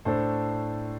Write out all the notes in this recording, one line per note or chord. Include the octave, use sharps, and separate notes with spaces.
A2 A3 D4 A4 C5